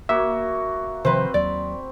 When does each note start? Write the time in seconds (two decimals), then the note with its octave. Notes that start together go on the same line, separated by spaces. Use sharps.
0.09 A#3 F#4 E5
1.05 C3 D#3 F3 C4 B4 C5 B5
1.34 D#2 F#3 D5